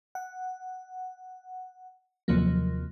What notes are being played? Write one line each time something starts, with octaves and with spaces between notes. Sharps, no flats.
F#5
D#2 C3 F3 F#3 A#3